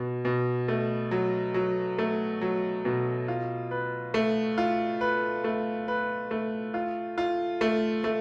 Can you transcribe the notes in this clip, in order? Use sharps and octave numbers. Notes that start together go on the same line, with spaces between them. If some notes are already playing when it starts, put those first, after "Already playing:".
Already playing: B2
B2
A3
F#3
F#3
A3
F#3
B2
F4
B4
A3
F4
B4
A3
B4
A3
F4
F4
A3
A3